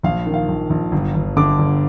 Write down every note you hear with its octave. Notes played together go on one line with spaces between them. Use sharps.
A#1 F5
D#3
F5
A#1
A#1
G1
G1
D3 D6
G1